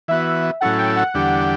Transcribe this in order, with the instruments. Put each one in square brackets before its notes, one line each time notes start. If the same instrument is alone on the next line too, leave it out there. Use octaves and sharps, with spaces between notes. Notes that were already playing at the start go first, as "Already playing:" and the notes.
[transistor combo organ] E3 B3 F#4 [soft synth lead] E5
[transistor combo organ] A2 F#3 C#4 E4 A4 [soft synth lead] F#5
[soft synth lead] G5
F#5
[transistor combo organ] E2 D3 G3 D4 G4